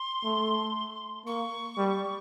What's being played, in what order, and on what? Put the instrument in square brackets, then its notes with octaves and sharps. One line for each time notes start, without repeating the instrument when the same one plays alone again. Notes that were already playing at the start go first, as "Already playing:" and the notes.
Already playing: [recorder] C6
[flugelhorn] A3
[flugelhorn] A#3 [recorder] C#6
[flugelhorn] G3